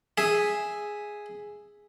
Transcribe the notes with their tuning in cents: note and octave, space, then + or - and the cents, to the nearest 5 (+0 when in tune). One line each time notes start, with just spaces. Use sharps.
G#4 +0 E5 +0